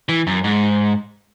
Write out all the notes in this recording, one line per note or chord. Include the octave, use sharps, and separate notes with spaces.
E3
F#2
G#2